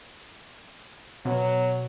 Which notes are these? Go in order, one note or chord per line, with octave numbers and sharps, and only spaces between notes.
B2 F#3